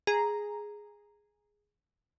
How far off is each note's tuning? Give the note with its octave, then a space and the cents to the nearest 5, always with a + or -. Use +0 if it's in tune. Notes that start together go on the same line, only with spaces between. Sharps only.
G#4 +0 A#5 +0